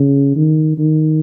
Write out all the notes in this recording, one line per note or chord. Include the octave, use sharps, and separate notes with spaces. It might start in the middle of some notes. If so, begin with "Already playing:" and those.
Already playing: C#3
D#3
D#3